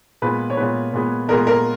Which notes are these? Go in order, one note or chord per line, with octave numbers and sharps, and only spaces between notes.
A#2 G#3 B3 B4
C#5
A#2 G#3 B3 B4
A#2 G#3 B3
A#2 G#3 B3 A#4
A#4